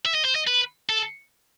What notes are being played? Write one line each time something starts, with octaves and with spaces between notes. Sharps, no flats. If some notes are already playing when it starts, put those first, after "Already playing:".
E5
D#5
C5
D#5
B4
A4